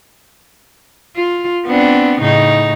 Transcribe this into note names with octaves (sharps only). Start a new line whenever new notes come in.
F4
B3 C4 D4
A2 C#3 D#4